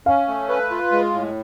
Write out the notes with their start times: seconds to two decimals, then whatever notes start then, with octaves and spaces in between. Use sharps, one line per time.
0.06 C#4 F5
0.28 A3
0.49 B4
0.71 F4
0.92 G#3
1.14 A2